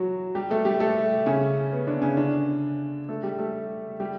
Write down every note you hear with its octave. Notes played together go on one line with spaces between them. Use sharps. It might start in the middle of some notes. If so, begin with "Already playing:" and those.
Already playing: E3 F#3 F#4
G3 G4
A3 A4
G3 G4
A3 A4
C#3 C#4
B3
D3 D4
C#3 C#4
D3 D4
A3 A4
G3 G4
A3 A4
G3 G4